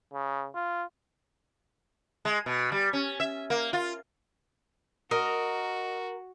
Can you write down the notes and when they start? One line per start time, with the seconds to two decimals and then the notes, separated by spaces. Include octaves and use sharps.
0.13 C#3
0.55 F4
2.25 G#3
2.46 B2
2.72 G3
2.93 C#4
3.20 E5
3.50 A#3
3.73 F4
5.11 F#4 A#4 D#5